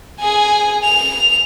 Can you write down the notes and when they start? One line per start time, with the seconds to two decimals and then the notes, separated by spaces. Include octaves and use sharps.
0.20 G#4 G#5
0.84 F7